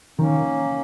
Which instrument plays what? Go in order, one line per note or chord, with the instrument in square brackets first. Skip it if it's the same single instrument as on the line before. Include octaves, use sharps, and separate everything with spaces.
[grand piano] D#3 [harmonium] A#3 C#4